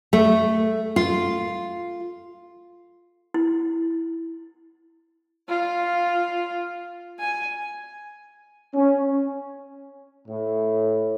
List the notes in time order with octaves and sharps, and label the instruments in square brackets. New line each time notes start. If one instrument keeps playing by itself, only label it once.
[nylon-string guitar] A3
F4
[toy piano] E4
[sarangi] F4
G#5
[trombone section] C#4
A2